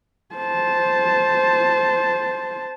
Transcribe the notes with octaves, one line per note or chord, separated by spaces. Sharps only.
C5 A5